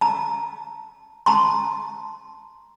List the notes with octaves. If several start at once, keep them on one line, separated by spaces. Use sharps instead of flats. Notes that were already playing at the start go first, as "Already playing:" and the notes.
A5 A#5
A5 A#5 C6